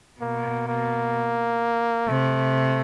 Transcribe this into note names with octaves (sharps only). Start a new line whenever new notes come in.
B2 A#3
A#3
C3 A3